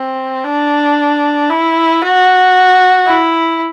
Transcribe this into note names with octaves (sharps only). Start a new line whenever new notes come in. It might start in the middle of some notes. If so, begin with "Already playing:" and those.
Already playing: C4
D4
E4
F#4
E4